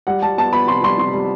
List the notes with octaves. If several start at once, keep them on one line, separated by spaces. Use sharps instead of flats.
G3 F#5
G3 A5
B3 A5
B3 B5
C3 C6
G3 C6
C3 C6
G3